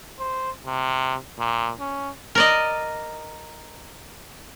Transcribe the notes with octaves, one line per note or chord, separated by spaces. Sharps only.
C5
C3
A#2
C#4
A#4 D5 D#5